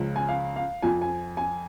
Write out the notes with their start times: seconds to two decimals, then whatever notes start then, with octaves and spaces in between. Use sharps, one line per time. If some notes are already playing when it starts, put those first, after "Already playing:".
Already playing: C#2 C#3 F3
0.16 G#5
0.29 F5
0.56 F5
0.82 F2 F3 G#5
1.02 G#5
1.37 G#5